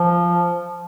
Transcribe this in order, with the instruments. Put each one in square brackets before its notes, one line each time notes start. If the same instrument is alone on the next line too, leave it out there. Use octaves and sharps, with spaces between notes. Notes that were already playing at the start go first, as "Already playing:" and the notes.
Already playing: [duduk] F3